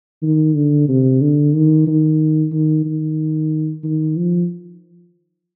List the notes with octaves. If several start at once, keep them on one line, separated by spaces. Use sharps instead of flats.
D#3
D3
C3
D3
D#3
D#3
D#3
D#3
D#3
F3